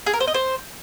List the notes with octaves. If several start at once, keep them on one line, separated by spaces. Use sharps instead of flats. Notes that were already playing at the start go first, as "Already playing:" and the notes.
G#4
A#4
C5
D#5
C5